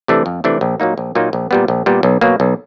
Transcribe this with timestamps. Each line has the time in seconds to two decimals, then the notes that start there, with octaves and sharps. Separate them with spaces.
0.08 C3 E3 A3 D4
0.26 F2
0.44 C3 E3 A3 D4
0.61 A#1
0.80 A#2 F#3 A#3 D#4
0.98 A#1
1.15 A#2 F#3 A#3 D#4
1.33 A#1
1.51 A#2 G3 B3
1.68 A#1
1.86 A#2 G3 B3
2.03 B1
2.21 B2 F#3 A#3
2.40 B1